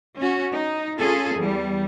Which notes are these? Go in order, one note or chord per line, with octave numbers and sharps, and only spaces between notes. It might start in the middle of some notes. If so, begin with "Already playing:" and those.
C#4 F#4
D#4
C#4 F4 G#4 A4
E2 G3